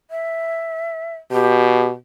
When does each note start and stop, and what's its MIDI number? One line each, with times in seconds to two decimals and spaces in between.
0.11 1.16 76
1.32 1.92 47
1.32 1.88 67